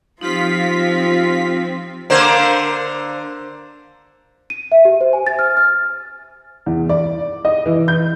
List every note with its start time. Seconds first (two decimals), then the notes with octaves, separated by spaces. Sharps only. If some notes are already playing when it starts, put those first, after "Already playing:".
0.21 F3 C4 D#4 F4 G4 C5 B6
2.10 D3 A#3 C5
4.50 D#7
4.72 E5
4.85 G4
5.01 C5
5.13 G#5
5.27 A6
5.39 F6
5.57 F6
6.66 E2
6.89 D5
7.45 D#5
7.66 E3
7.88 G6